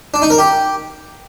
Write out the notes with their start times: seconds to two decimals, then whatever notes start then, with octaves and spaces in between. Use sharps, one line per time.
0.14 D4
0.22 D#4
0.30 A#4
0.38 G4